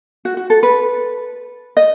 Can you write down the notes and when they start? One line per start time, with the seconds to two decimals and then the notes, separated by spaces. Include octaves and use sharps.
0.25 F#4
0.37 F#4
0.50 A4
0.63 B4
1.77 D#5